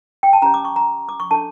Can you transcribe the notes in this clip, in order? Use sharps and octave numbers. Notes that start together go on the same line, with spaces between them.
G5
A5
C#4 G4 C#5 A#5
D6
C#6
A#5
D6
C#6
D4 A4 C#5 A5